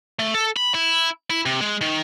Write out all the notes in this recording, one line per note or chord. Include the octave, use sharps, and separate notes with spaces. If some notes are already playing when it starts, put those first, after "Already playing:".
A3
A4
B5
E4
E4
C3
G#3
D#3